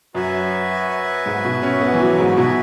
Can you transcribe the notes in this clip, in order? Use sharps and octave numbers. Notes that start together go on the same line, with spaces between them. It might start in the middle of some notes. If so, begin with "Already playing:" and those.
F#2 F#4 B4 E5 G#5
G#2
B2
C#4
B3
E3
F#3
G#2
B2 F#4 E5 G#5